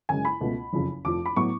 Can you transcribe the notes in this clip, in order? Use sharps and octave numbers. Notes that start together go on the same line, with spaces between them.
F#2 C#3 G#3 G#5
B5
C#2 B2 A3
F#1 F2 C#3
F1 F2 F3 D6
B5
A2 F#3 B3 C#6